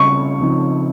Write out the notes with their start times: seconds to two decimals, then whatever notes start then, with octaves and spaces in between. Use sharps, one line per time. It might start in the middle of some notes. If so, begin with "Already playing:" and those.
Already playing: C#3 G3 C4 F4 C#6
0.40 C#3 F3 C4 D#4